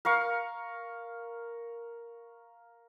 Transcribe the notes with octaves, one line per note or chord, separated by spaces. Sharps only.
A#4 F5 C#6